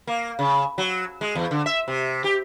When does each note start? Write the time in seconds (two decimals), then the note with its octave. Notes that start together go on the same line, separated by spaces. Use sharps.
0.07 A#3
0.39 C#3
0.78 F#3
1.21 G#3
1.35 E2
1.51 D3
1.66 E5
1.88 C3
2.24 G4